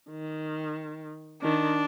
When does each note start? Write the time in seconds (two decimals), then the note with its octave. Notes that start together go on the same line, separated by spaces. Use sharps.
0.10 D#3
1.42 D#3 D4